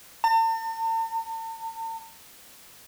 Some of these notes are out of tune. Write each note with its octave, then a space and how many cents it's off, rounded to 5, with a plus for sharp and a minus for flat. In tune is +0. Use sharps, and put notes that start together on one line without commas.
A5 +45